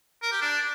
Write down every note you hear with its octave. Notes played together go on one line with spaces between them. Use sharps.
A#4
G4
D4